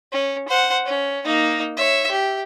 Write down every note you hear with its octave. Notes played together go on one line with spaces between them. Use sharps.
C#4
C5 F#5
C#4
A#3 D#4
C#5 E5
G4